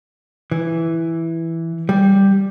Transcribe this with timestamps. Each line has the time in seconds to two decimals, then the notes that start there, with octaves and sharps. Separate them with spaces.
0.52 E3
1.89 G3